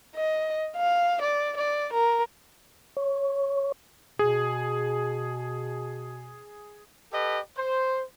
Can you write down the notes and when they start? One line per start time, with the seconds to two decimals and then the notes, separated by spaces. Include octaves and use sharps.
0.15 D#5
0.77 F5
1.22 D5
1.57 D5
1.93 A#4
2.97 C#5
4.19 B2 G#4
7.13 G4 A4 B4 D#5
7.56 C5